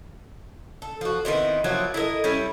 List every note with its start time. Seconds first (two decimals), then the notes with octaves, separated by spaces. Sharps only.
0.82 A4
1.01 F3 F#4
1.25 D#3 B3 C4 E4
1.64 F3 F#3 A#3 E4
1.94 E4 A4 A#4 D#5
2.24 G3 C#4 E4 E5